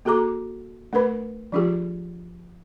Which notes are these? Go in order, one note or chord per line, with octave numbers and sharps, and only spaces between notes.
A#3 F#4 G#4 A4 A#5 D6
A3 D4 A#4 B4 B5
F3 G#3 D4 F4 G4 G#4